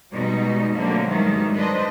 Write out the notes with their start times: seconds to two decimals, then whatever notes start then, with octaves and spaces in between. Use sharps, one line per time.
0.14 B2 G3 G#3 D#4
0.76 D3 F#3 A3 A#3 C4
1.08 G#2 D#3 E3 F#3 G3
1.56 D4 B4 C5 D#5